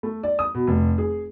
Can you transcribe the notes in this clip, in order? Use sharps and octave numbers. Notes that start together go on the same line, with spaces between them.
A3
D5
D#6
B2
F1
G#4